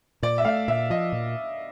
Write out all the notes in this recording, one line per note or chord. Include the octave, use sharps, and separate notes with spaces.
A#2 D5
E5
A3 F5
A#2 E5
F3 D#5
A#2